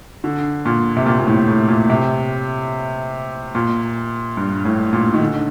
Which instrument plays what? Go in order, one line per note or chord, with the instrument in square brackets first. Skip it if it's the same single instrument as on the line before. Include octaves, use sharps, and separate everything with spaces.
[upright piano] D3
A#2
C3
A#2
A#2
A2
A2
A#2
C3
A#2
G2
A2
A#2
D#3
D3